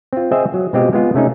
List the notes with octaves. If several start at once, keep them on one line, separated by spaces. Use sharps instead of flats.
C4 F4
C4 G#4 C5 D#5 E5
F#3
B2 G#3 C4 F4 G4 D#5
G#3 B3 F4
C3 A3 C#4 D#4